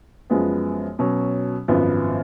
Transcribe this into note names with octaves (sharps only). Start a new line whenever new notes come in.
F#2 F3 G#3 B3
B2 F#3 C#4
G#1 F#2 F3 B3